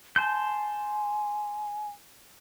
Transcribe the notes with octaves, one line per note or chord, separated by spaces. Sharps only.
G#5 A5 C6 G6